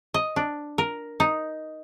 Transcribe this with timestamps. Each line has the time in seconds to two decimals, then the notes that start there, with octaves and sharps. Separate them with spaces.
0.14 D#5
0.36 D4
0.78 A#4
1.20 D#4